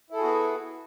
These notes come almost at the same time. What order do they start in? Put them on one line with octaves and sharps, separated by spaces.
E4 A4 G#4 F#4 B3